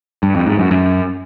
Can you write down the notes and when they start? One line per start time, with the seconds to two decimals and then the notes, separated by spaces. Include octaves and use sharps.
0.23 G2
0.35 F2
0.47 G#2
0.59 F#2
0.71 F#2